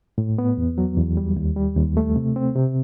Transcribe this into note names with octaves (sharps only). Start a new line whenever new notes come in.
A2
B3
E2
F#3
E2
G3
D#2
G3
D#2
A3
C3
C4
C3